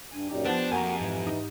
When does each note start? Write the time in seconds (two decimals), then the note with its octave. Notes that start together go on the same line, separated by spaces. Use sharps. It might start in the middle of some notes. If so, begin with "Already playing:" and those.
0.13 G2 G#5
0.30 F#2 A#2 D#4 G4
0.45 F3 B3 D4 C5
0.72 F2 A#3 F#4 A#4 G#5 A#5
1.00 G#2 E3
1.27 D#4